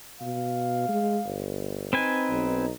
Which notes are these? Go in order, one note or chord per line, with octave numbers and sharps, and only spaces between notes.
B2 F5
G#3
G1
C4 D#4 B4 G#5
B1